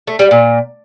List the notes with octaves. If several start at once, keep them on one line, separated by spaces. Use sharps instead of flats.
A3
G3
A#2